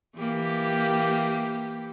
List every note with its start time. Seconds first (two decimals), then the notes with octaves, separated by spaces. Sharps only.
0.18 E3 A#3 G4